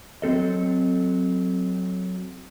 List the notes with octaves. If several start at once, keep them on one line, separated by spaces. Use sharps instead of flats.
F#3 C4 A4 D#5